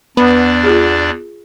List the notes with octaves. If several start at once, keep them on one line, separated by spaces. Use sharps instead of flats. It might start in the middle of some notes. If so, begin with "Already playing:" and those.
E2 B3 D4 D5
F4 G4 G#4